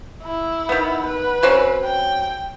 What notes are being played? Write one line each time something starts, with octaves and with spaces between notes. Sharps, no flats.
E4
D#3 B3
B4
F#3 C4 C#4
G5